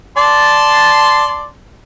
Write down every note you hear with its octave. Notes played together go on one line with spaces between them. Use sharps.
D5 A5 C6